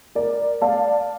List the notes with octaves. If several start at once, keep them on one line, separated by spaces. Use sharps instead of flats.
A#4 D5
D5 F5 A5